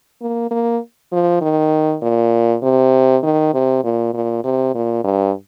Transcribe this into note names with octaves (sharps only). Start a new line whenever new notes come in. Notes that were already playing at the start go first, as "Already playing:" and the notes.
A#3
A#3
F3
D#3
A#2
C3
D#3
C3
A#2
A#2
C3
A#2
G2